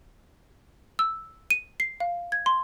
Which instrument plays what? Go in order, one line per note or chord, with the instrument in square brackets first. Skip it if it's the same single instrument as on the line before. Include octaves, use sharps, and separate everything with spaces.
[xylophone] E6
D#7
C7
F5
G#6
C6